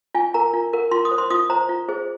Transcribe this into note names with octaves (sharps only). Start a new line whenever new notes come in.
F4 G#5
A#4 A#5
F4
A#4
F4 C6
D#6
C5
C6
F4 D#6
C5 A#5
F4
G#4 C5